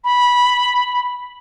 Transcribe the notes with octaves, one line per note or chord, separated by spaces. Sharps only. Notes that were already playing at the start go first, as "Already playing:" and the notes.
B5